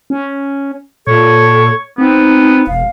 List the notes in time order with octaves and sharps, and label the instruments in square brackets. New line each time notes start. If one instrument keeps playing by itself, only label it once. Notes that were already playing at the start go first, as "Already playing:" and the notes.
[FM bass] C#4
[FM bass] A#2 [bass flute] A4 [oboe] C#5
[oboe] B3 [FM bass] C4 [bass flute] D#4
[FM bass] E1 [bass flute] F5